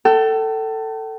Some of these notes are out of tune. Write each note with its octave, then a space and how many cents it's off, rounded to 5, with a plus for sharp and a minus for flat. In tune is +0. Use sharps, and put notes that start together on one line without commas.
A4 +15 G5 -40